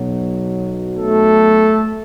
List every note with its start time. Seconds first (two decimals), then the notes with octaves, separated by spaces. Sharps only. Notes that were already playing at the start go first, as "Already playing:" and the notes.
Already playing: B1 B2 F#3
0.95 A3 A4